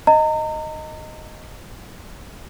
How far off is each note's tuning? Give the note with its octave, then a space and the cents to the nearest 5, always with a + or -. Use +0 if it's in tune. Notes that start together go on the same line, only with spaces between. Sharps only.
D#5 +0 A#5 -35